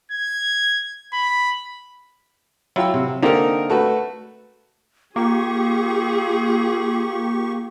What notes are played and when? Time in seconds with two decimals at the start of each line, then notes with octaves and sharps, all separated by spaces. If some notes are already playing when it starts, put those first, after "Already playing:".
0.12 G#6
1.13 B5
2.76 F#3 E4 F4 G5 E6
2.94 C3
3.23 D3 A#3 C4 D#4 A#4
3.70 A3 F#4 B4
5.16 A#3 F4 G4 G#4 C#6